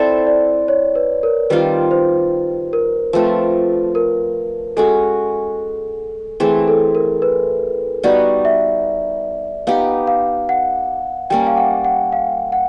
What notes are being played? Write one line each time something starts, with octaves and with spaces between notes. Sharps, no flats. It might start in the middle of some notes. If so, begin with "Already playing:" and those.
Already playing: C4 E4 A4 C5 D5
D5
C#5
B4
A#4
D#3 G3 C4 F4 B4
C5
A#4
F3 A3 C4 B4
A#4
G#3 C#4 F#4 A4
E3 A3 C4 G#4
A4
A#4
B4
G3 B3 D#4 F#4 D5
E5
B3 D#4 G4 F5
F5
F#5
G3 A#3 C#4 G5
F5
F#5
F#5
F5
F#5